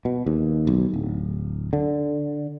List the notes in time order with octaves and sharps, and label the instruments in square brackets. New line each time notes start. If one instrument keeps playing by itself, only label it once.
[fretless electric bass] B2
D#2
B1
D1
D3